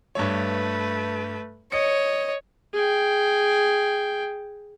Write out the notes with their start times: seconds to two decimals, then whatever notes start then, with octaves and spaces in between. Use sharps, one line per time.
0.15 G2 A3 B4 C#5
1.72 C#5 D#5 C#7
2.74 G#4 G5